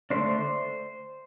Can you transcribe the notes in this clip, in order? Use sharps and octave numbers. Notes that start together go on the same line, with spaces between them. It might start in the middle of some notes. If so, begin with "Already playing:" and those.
D3 A3 D4 C5